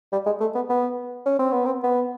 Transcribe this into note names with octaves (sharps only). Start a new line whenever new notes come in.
G3
G#3
A3
B3
B3
C#4
C4
B3
C4
B3